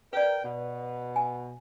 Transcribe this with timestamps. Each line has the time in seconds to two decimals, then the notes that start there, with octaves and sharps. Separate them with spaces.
0.13 A#4 B4 D5 G5
0.43 B2
1.16 G#5